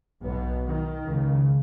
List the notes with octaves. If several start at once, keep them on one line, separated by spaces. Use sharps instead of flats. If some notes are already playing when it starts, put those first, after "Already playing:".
B1 B2 B3
D#3
C#2 C#3